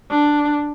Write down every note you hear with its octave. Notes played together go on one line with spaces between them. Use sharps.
D4